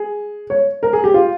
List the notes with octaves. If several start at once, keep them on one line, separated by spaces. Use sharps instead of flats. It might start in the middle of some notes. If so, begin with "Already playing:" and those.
Already playing: G#4
C#5
A#4
G#4
G4
F4